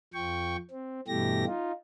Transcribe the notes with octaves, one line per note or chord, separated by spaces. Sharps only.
F2 F3 G5 C#6
C4
G2 B2 E3 A3 G4 A#6
D#4 F4